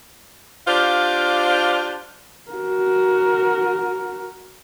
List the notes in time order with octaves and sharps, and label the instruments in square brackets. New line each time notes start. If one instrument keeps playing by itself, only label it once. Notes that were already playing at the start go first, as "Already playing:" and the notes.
[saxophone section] D4 F4 G4 C5 D5 F5
[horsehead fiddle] F#4 A#4